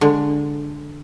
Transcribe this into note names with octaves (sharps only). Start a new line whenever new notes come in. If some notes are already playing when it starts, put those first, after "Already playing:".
D3 G#3